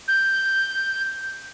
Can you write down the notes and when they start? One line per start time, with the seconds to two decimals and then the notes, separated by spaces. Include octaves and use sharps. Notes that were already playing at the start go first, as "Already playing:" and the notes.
0.08 G6